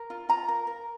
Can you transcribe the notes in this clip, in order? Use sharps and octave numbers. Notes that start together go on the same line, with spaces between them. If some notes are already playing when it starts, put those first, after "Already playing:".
Already playing: A#4
F4
F4 A#5
A#4
A#4